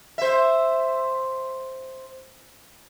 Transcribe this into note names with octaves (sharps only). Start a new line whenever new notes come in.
C5 E5